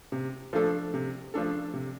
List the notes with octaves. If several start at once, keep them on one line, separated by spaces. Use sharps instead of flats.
C3
F3 A3 D4 A4
C3
F3 A3 D4 A4
C3